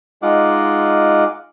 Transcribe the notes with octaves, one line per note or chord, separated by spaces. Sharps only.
G#3 D#4 F4 F#5 D6